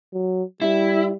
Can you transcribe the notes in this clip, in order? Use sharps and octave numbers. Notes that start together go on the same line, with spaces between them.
F#3
G3 E4